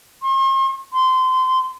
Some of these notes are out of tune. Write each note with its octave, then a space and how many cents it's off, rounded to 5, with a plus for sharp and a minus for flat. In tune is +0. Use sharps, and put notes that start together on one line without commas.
C6 +45
C6 -20